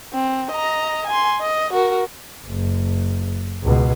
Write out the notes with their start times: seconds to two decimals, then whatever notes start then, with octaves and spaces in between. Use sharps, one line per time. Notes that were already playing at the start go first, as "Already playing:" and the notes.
0.14 C4
0.51 D#5 A#5
1.07 G#5 C6
1.41 D#5
1.73 F#4 A#4
2.46 F#1
3.63 C#2 B2